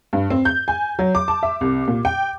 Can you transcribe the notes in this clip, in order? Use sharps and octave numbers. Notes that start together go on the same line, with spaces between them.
G2
C4
G6
G#5
F#3
D6
A5
E5
C2
A#2
G5